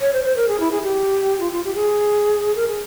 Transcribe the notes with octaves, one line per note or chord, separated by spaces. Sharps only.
C#5
C5
C5
A#4
G#4
E4
G#4
G4
F4
F4
G4
G#4
A#4
G#4